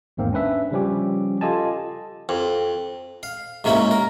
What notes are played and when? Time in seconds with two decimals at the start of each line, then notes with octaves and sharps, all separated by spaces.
0.17 G#1 E2 G#2 A#3 C4
0.33 C#4 D4 B4 E5
0.71 C#3 F3 G3 C#4 G4
1.41 F4 G4 A4 D#5 G#5 A5
2.29 F2
3.23 F5
3.64 G#2 C3 A#3 C#4 E4
3.91 A#4